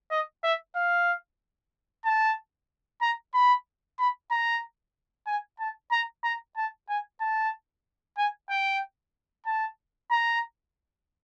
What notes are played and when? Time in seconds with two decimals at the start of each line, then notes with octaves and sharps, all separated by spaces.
0.11 D#5
0.43 E5
0.75 F5
2.05 A5
3.01 A#5
3.34 B5
3.98 B5
4.31 A#5
5.27 G#5
5.59 A5
5.91 A#5
6.24 A#5
6.56 A5
6.89 G#5
7.20 A5
8.17 G#5
8.49 G5
9.46 A5
10.11 A#5